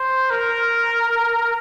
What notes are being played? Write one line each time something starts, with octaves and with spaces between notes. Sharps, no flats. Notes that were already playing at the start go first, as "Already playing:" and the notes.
Already playing: C5
A#4